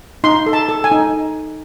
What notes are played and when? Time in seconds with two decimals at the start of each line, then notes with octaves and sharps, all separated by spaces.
0.24 D#4 C6
0.46 A4
0.53 A5
0.69 A4
0.84 G#5
0.91 D#4